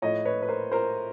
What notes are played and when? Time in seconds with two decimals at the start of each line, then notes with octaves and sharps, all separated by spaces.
0.02 A2 F3 C#5 D#5
0.25 B4 C#5
0.42 B4
0.48 A#4 C5
0.72 A#4 C5